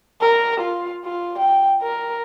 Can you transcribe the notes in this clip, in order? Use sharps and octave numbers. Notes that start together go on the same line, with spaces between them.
A#4
F4
F4
G5
A#4